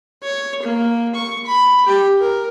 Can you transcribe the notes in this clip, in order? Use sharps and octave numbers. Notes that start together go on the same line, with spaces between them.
C#5
A#3
C#6
B5
G4
A#4